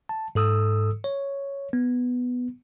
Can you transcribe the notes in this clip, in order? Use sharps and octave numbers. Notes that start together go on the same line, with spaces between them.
A5
G#2 A4 D#6 E6
C#5
B3